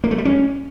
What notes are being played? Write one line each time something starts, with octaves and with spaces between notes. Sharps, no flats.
A#3
A3
G3
C#4